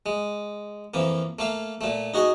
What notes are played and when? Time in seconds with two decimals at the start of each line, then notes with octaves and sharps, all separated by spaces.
0.06 G#3
0.94 F2 E3 A#3
1.39 A3 A#3 F5
1.81 A#2 A3
2.14 D#4 F#4 G#4 D#5